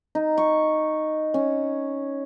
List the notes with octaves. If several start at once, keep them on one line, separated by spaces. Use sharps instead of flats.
D#4
C#6
C#4